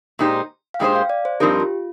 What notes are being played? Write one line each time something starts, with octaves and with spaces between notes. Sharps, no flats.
A#2 G#3 D#4 G4 C5
F5
A#2 G#3 D#4 G4 C5 G5
F5
D5
C5
G2 F3 C4 D#4 G4 A#4
F4